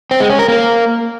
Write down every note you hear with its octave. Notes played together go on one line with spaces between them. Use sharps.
C4
G#3
C#4
A#4
A#3